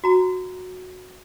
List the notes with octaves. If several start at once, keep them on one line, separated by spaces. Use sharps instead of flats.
F#4 A#5